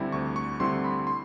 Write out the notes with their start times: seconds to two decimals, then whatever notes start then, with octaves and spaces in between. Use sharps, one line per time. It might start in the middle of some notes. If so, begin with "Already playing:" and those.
Already playing: D2 D3 G3 C4 E4
0.12 D2 C#6
0.36 C#6
0.60 D3 G3 C4 E4 C6
0.84 B5
1.07 C6